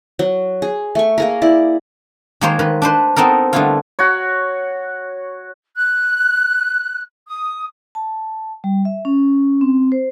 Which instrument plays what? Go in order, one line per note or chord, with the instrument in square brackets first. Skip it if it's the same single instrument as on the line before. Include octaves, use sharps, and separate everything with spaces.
[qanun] F#3
G#4
A3 C#6
A#3 G#4 A#4
E4 D5
[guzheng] D#3 G#3 A#3 G#4 C5 C#5
D#3 B4
D4 B4 C5
B3 C4 D#4 A4 A#4
D3 G3 A3 B3 E4 F4
[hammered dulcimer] F#4 C#5
[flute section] F#6
D#6
[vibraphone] A5
G3
E5
C#4
C4
C5